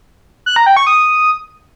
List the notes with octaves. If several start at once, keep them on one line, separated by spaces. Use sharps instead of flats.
F#6
A#5
G5
C#6
D#6